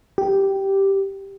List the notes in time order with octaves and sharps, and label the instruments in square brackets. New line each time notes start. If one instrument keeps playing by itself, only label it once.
[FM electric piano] G4